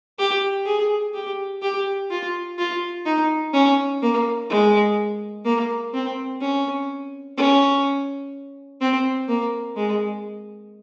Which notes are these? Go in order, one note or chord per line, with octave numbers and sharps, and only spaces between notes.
G4
G#4
G4
G4
F4
F4
D#4
C#4
A#3
G#3
A#3
C4
C#4
C#4
C4
A#3
G#3